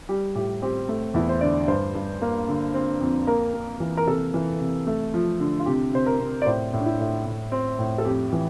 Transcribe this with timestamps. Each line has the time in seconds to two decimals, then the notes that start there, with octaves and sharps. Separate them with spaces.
0.09 G3 G4
0.35 A2 G4
0.62 C4 G4
0.89 A3
1.14 E2 E4
1.29 C5
1.41 D3 D5
1.68 G2 C5
1.95 G2
2.22 A#3
2.48 D3
2.74 C4
3.01 F2
3.27 A#3 A#4
3.53 A#3
3.80 E3
3.97 A#4
4.07 C3 A4
4.34 E3
4.60 C3
4.87 A3
5.14 F3
5.40 D3
5.59 F4
5.66 C3 G4
5.93 C3 C5
6.06 A#4
6.20 C3
6.42 D5
6.46 A2 C5
6.73 A2
6.80 D4
6.86 E4
7.00 A2
7.26 A2
7.52 C4
7.79 A2
7.98 A4
8.05 F2 G4
8.33 E3